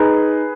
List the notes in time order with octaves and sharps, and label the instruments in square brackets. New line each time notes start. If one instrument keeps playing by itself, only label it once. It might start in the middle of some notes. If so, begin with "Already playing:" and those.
Already playing: [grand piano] D#4 G#4 B4